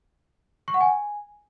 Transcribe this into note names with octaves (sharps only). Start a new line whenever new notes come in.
C#6
F#5
G#5